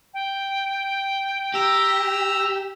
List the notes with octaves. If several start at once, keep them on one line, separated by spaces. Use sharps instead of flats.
G5
G4 A#5 E6